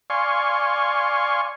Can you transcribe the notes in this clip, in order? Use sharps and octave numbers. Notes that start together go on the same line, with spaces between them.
D5 F5 G#5 C6 C#6